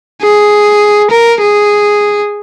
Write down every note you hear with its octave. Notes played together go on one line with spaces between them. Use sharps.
G#4
A#4
G#4